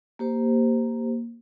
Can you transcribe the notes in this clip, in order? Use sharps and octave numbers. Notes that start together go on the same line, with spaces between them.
A#3 G4 C5